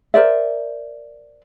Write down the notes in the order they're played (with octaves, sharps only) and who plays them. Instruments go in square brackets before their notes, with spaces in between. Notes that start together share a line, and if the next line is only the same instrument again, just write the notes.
[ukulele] A#4 C5 D5 E5